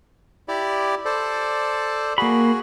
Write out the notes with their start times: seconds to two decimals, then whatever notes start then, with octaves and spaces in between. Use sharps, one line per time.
0.48 E4 G4 D5
1.05 A4 C5 D5
2.18 A#3 F#4 G#4 B5